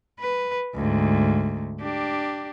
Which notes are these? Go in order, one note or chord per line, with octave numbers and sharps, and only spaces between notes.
B4
D2 G#2
D4 G4